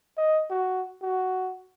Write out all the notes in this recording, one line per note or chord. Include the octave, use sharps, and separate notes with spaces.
D#5
F#4
F#4